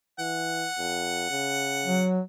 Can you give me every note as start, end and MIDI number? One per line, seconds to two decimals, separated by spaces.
0.19 0.68 52
0.19 2.08 78
0.78 1.28 41
1.30 2.05 49
1.85 2.21 54